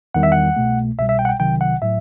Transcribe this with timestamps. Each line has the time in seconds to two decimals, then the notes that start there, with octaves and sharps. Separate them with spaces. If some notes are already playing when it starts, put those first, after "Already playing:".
0.14 E2 D#3 G3 F#5
0.23 E5
0.32 F#5
0.56 C2 B2 A3
0.98 C2 B2 G3 E5
1.09 E5
1.19 G5
1.25 F#5
1.29 G5
1.40 C2 C3 D#3 F#3 G5
1.61 F#5
1.82 A2 F#3 E5